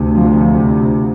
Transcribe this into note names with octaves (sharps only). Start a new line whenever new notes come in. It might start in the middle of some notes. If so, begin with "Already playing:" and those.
Already playing: D2 C3
F3